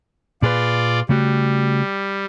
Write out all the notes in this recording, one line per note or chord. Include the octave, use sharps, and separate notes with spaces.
A#2 F4 G#4 B4 D5
C#3 G3 A3 F#4